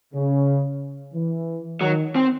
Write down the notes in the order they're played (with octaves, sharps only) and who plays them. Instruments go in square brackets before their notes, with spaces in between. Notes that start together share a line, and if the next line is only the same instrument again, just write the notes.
[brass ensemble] C#3
E3
[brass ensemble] D#3 [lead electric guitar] F#3
[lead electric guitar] C4